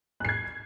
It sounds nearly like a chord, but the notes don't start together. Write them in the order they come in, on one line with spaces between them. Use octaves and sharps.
F#6 C7 G#6